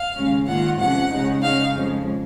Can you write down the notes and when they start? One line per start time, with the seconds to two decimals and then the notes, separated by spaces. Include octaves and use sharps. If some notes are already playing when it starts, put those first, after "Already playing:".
Already playing: F5
0.15 D#2 C#3 G#3 C#4
0.47 G#2 D#3 A#3 F4 F#5
0.78 F2 C3 F3 G#3 C#4 F#5
1.10 C#3 G#3 D#4
1.42 C#3 G#3 D#4 F5
1.73 F2 C#3 F3 G#3